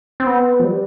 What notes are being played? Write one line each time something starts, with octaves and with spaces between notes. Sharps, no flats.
C4
B3
F3
G3